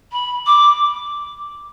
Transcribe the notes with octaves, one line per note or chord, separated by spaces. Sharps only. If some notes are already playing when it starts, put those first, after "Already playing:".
B5
D6